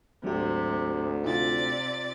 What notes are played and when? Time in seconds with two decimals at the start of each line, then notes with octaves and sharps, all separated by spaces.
0.24 D2 G#2 C3 F#3 G4
1.24 C3 D#4 F4 D5 A6